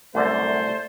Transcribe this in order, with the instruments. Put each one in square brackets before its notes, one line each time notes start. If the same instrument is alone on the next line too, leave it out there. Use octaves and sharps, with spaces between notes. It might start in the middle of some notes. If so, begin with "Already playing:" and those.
[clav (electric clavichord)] C2 F#2 D3 [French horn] A3 [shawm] C5 [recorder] D5